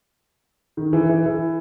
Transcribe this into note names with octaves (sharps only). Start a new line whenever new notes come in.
D#3
E3
E3
E3